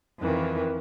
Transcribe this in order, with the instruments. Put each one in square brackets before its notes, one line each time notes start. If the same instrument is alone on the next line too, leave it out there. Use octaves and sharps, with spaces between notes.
[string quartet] F2 D#3 E3